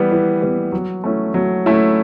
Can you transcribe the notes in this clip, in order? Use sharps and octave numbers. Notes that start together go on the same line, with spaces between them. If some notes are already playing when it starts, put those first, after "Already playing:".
Already playing: E3 G3 B3
E3
G3 B3
F#3
A3 C#4 E4
F#3
A3 C#4 E4